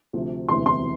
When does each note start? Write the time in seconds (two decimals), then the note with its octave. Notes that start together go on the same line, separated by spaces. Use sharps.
0.13 D2 C3 F3
0.49 E1 D2 C3 E3 C6
0.66 C6